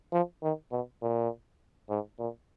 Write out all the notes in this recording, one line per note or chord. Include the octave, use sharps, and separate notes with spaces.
F3
D#3
B2
A#2
G#2
A#2